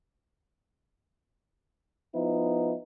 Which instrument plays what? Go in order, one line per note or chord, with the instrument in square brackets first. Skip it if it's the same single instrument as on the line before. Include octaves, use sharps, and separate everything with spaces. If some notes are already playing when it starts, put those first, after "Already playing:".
[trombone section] F3 B3 D#4 E4